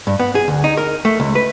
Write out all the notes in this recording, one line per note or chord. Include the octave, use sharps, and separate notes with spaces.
G2
B3
G#4
D2
D#4
A#4
A3
C#2
B4